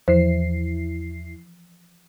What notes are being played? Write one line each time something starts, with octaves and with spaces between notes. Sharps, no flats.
E2 E3 F3 E4 C5 C7